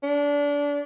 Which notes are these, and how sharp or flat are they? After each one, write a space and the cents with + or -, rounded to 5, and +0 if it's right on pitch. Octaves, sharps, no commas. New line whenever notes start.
D4 -25